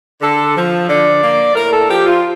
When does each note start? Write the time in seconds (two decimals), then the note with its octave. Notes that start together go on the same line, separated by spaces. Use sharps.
0.21 D3 A4
0.56 F3
0.88 D3 D5
1.22 A#3
1.55 A2 A#4
1.71 A4
1.88 F3 G4
2.05 F4